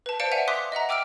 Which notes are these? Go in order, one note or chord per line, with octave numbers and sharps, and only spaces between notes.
B4 A5
C5 D5 F5 A5 C#7 D7
E5 F#5 G#5 C#7 D#7 F7
C6 D6 D#6 F#6 B6
D#5 E5 F#5 A#5
G5 D6 E6 F6 D7